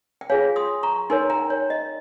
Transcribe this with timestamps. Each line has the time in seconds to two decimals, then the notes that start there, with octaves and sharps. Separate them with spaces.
0.21 G5
0.30 F4 G#4 C#5 F5 G#5
0.56 C6 D#6
0.83 A#5 C#6
1.10 D#4 A#4 C#5 G#5 C6
1.30 G5 A#5
1.50 C#5
1.70 D#5